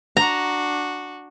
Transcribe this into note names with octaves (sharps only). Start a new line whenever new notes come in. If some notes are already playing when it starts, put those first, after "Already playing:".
D4 F#4 A#5